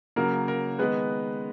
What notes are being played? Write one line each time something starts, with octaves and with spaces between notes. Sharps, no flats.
C#3 F#3 A#3 A#4
A#4
D#3 G#3 B3 B4